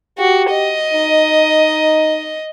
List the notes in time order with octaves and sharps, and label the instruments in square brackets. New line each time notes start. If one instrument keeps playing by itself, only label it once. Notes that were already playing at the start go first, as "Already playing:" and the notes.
[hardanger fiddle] F#4 [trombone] G4
[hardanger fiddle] D#5
[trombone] D#4